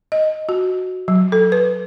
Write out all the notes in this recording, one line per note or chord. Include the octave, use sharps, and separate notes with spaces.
D#5
F#4
F#3
A4
B4